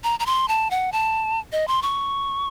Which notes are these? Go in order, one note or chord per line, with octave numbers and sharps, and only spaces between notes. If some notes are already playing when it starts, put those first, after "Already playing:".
A#5
A#5
C6
A5
F#5
A5
D#5
C6
C#6